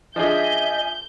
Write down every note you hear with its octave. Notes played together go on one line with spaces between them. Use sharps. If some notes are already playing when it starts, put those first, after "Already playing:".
F3 D4 G#4 D#5 E5 G#5 G6